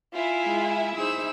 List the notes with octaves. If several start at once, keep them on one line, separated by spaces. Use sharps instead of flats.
E4 F4 E5 G#5
G#3
D#4 G#4 C5 E6